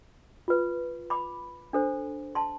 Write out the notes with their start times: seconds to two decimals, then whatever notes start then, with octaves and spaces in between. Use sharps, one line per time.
0.48 F4 B4
1.10 B5 D6
1.73 D4 A4 C5
2.35 A5 C6